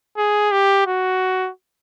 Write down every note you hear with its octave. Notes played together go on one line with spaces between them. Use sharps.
G#4
G4
F#4